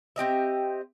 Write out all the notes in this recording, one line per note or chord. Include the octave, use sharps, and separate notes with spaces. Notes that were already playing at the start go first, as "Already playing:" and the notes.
C4 G4 D#5 E5